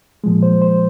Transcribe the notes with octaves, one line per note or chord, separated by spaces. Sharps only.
A#2 F3 G#3
C5
C5